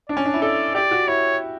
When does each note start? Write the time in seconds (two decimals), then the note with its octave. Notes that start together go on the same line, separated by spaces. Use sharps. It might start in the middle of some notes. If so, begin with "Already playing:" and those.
0.09 D4 D5
0.17 C#4
0.26 D4
0.34 E4
0.42 A4 D5
0.75 G4 D5
0.91 F#4
1.08 E4 C#5